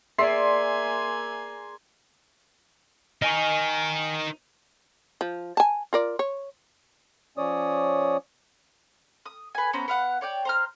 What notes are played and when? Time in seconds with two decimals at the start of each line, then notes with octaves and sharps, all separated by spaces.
0.18 A#3 G#4 D5 E5 G#5 C6
3.22 D#4 A#4 D#5 G#5 C#6
5.21 F3
5.57 G#5 A5
5.93 F4 A#4 D5
6.19 C#5
7.38 F3 C#4 C#5 D5 D#6
9.25 D#6
9.55 B4 G#5
9.73 B3 C#4 C5 A#5
9.88 B3 F5 F#5
10.21 C#5 D5 G5
10.45 C5 A#5 F6